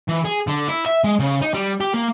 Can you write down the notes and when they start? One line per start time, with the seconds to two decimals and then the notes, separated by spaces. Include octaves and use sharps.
0.09 E3
0.25 G#4
0.48 D3
0.69 E4
0.86 E5
1.04 G#3
1.19 C#3
1.42 D#4
1.54 G3
1.81 G4
1.94 A#3